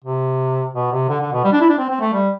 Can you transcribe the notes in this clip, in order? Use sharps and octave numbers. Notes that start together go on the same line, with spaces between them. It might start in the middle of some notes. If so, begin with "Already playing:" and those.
C3
B2
C3
D3
D3
B2
G3
D4
E4
D4
C4
C4
A3
G3